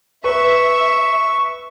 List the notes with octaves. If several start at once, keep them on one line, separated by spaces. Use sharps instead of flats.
B4 E5 C#6